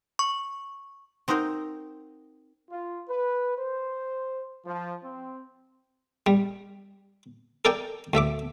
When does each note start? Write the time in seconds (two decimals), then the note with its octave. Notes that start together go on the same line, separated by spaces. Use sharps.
0.19 C#6
1.28 C4 D#4 F#4 A#4 C5
2.71 F4
3.08 B4
3.58 C5
4.66 F3
5.04 C4
6.26 G3
7.65 A4 A#4 D5 G5 G#5
8.13 D2 A3 E5 D6